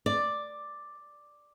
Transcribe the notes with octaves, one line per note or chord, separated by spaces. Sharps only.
D5